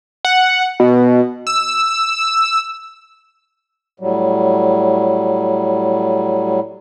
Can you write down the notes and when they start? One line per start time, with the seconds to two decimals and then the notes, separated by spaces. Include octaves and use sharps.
0.25 F#5
0.80 B2
1.47 E6
4.00 A2 F#3 G3